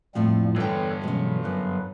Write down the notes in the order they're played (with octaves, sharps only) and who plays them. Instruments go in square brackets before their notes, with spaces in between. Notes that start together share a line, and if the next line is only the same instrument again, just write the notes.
[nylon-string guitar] F2 A2 F3 [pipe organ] G3 A#3 C4
[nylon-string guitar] E2 G5 [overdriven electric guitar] G2 D3 [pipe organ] A4 B4 C#5
[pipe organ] B2 E3 F#3 [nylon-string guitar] G#3 C#4
[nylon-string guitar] F#2 [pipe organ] F#3 B4